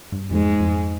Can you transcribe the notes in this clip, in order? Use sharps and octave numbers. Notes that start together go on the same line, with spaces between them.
G2
F2 G#2 G#3
F2